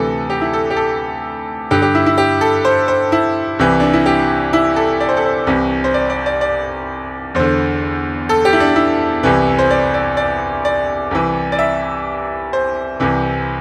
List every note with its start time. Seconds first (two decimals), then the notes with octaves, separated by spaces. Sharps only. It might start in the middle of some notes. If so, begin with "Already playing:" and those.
Already playing: D2 C3 E3 A4
0.30 G4
0.41 E4
0.53 A4
0.70 G4
0.76 A4
1.71 G2 D3 G4
1.82 G4
1.95 E4
2.06 E4
2.18 G4
2.41 A4
2.65 C5
2.88 C5
3.12 E4
3.59 C2 C3 E3
3.80 D4
3.93 E4
4.06 G4
4.53 E4
4.76 A4
5.00 D5
5.09 C5
5.17 A4
5.25 C5
5.47 C2 C3 E3
5.84 C5
5.94 D5
6.10 D5
6.26 D5
6.41 D5
7.35 E2 D3 C5
8.29 A4
8.45 G4
8.53 E4
8.60 D4
8.76 E4
9.23 C2 C3 E3
9.59 C5
9.71 D5
9.94 D5
10.17 D5
10.65 D5
11.11 C2 C3 E3
11.52 D5
11.59 E5
12.53 C5
13.00 C2 C3 E3